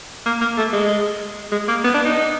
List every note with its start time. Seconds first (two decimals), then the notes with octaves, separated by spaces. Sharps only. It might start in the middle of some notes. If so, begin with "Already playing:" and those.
0.26 A#3
0.41 A#3
0.58 A3
0.73 G#3
1.52 G#3
1.69 A#3
1.84 B3
1.94 D4
2.05 D#4